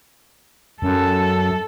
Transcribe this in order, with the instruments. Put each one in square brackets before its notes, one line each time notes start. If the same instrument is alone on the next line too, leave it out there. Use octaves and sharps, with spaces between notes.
[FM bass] F#2 [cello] A4